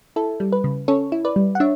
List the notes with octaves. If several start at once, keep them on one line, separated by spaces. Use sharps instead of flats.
E4 A4
G3
B4
C#3
C#4 A4 C#5
E4
B4 D5
G3
F#5
D4 C#5 E5